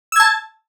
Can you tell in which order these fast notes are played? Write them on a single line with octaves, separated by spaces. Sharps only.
E6 G#6 A5